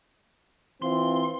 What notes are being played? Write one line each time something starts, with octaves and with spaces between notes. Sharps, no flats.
E3 C4 F4 C6